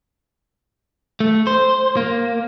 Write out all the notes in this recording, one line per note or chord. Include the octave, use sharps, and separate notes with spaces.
A3
C5
A#3